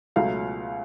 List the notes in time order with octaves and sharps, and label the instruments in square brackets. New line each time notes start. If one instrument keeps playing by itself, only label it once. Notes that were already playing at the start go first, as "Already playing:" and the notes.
[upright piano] C#2 B2 F#3 A3 F5